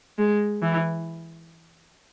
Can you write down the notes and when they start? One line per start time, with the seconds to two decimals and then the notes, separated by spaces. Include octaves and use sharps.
0.18 G#3
0.62 E3